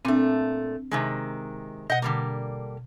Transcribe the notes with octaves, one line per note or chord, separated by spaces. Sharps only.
A#2 A3 C4 D4
C3 D#3 G#3
B2 D#5 F#5 G6
D3 G3 A#3